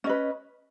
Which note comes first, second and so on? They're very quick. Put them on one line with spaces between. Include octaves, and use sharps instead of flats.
C#4 D#5 B4